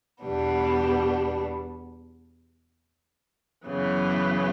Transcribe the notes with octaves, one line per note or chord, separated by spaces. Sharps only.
E2 B2 G3 B3 D4
F#2 C#3 E3 B3